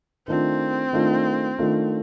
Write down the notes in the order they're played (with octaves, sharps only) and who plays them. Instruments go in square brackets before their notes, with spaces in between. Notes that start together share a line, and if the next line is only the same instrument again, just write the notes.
[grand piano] D#3 A3 D4 F4 [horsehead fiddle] C4
[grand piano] D#3 A3 D4 F4
D#3 A3 D4 F4